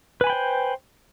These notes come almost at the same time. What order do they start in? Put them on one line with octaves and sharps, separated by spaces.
B4 G#5 B5 G5 C5